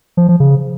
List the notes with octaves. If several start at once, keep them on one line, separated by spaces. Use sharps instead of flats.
F3
F3
C#3